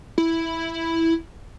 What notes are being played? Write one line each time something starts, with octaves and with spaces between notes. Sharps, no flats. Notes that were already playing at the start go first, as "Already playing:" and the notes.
E4